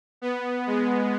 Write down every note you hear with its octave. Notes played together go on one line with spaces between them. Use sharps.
B3
G#3